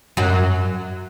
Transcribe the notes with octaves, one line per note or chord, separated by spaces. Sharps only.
F#2 F#3